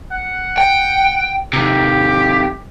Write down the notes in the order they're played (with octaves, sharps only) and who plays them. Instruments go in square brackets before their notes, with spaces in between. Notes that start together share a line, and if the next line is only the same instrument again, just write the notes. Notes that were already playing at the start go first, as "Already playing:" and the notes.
[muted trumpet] F#5
[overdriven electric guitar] G5
[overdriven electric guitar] C3 D#3 [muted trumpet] G4